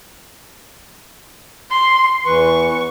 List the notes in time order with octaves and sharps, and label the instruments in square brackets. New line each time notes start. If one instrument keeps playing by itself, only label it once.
[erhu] C6
[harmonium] E2 E3 B4 [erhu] C#6